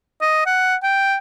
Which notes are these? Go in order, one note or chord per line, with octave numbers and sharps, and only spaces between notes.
D#5
F#5
G5